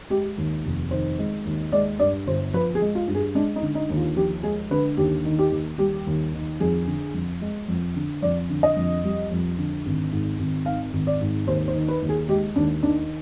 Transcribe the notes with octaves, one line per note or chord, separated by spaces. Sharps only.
G#3 G4
D#2
F1
D#3 C5
G#3
D#2
G#3 D5
G2 D5
G1 C5
F3 B4
G#4
G#3
F4
G2
G#4
G#3 D4
D#4
D3
D#4
D#2
F4
F3 G4
G#3 G#4
D3 B4
D#2 G4
D#3
G4
D#2
G3 G4
D#2
D#3
F2 G#4
D3
F2
G#3
F2
D3
F2 D5
D3
D#5
F2
G3
F2
D3
G#1
G#2
G#1
D#3 F5
G#1
D5
G#2
D#2 C5
C5
D#3
B4
D#2
G#4
G#3 G4
D#2 D4
D#3 D4